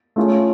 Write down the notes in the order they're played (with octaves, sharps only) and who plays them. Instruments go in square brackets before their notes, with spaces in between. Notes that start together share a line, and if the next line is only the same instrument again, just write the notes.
[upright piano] A3 C#4 F4 G#4